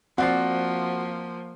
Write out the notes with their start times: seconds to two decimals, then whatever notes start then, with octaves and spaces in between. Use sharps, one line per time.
0.18 F3 A#3 C4 F#4 D5 C7